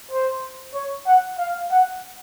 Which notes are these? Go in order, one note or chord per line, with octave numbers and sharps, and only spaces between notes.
C5
C#5
F#5
F5
F#5